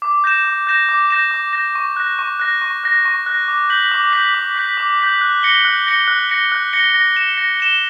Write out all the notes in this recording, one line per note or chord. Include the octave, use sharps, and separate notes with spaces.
D6
G6 A#6 E7
D6
G6 A#6 E7
D6
G6 A#6 E7
D6
G6 A#6 E7
C#6
F#6 A#6
C#6
F#6 A#6
C#6
F#6 A#6
C#6
F#6 A#6
D6
G6 B6 F#7
D6
G6 B6 F#7
D6
G6 B6 F#7
D6
G6 B6 F#7
F#6
A#6 C#7 G7
F#6
A#6 C#7 G7
F#6
A#6 C#7 G7
F#6
A#6 C#7 G7
A#6
E7 G7
A#6
E7 G7